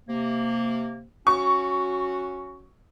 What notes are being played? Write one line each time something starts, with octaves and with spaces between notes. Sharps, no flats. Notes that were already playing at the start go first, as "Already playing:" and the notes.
C3 A#3
F#3 C#4 F#4 C#6